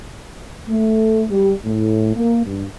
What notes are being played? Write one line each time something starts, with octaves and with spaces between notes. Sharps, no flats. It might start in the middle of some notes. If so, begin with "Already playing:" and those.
A3
G3
A2
A#3
G2